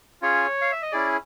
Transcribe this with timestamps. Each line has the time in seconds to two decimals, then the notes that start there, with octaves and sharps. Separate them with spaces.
0.22 C#4 F4 G#4 C#5
0.61 F5
0.72 E5
0.82 D#5
0.92 C#4 E4 G#4 D5